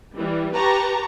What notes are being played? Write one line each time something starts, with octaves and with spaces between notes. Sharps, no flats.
E3 G3
G4 B4 A5 A#5 C#6